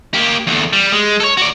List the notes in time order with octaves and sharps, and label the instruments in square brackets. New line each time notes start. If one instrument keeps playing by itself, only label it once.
[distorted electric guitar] A#3 G4
E2 D3
G3
G#3
A4 C#5
F#4 D5